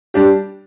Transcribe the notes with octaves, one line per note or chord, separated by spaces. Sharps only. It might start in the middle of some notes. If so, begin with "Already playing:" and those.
G3 D4 G4